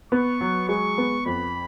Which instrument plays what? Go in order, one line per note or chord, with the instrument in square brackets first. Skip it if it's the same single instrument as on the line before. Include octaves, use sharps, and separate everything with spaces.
[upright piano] B3 [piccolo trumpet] C#6
[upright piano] F#3
[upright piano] G#3 [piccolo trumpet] C#6
[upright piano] B3
[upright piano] F2 [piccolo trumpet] B5